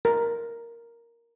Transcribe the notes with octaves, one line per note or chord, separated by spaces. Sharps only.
A#4